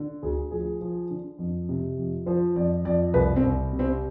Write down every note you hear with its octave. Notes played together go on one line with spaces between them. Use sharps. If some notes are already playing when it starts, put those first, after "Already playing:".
Already playing: D3
D2 G#4
F3 G#4
F3
D3
F2
C3
F2
F3 C5
F2 D5
F2 D5
C2 B4
C4
C2
C3
C4